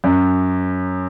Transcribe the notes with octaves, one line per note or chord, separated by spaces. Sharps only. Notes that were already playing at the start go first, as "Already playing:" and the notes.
F#2